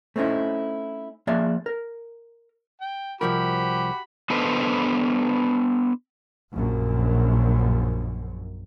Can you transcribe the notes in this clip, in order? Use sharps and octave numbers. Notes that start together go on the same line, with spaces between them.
A3 C4 C#4 D#4 E4
F3 A#3 G#4 C#5 D5 E5
A#4
G5
C2 F3 F#4 G4 A#4 B5
B3 D4 A4 B4 C5 D#5
A#1 F#2